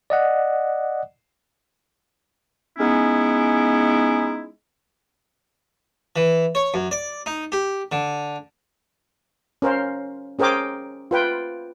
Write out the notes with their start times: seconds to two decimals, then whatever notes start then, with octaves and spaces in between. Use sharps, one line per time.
0.10 D5 D#5 F#5
2.78 G#3 B3 C#4 D#4 E4
6.16 E3
6.55 C#5
6.74 F#2
6.91 D5
7.26 D#4
7.52 G4
7.92 D3
9.62 C#4 A#4 C5 F5
10.39 C#4 G#4 A#4 C5 G5 D6
11.11 F4 B4 G5